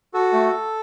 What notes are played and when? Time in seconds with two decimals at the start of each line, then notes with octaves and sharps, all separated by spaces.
0.14 F#4 A4
0.33 A3